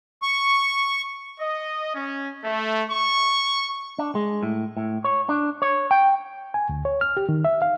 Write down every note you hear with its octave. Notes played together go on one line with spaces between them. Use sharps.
C#6
D#5
C#4
A3
C#6
D4
G#3
A2
A2
C#5
D4
C#5
G5
G#5
D2
C#5
F6
G4
D#3
E5
F5